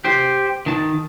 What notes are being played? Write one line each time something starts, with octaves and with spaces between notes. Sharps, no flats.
G4 C5
D#3 A5